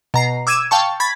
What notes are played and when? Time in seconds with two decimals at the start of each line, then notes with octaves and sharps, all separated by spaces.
0.14 B2 A#5 C7
0.47 D6 E6 G#6 D#7 E7
0.71 F5 G5 A5 C#6
1.00 B5 G#6 A6 B6